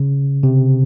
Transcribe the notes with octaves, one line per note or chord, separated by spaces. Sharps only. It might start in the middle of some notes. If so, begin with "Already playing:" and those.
Already playing: C#3
C3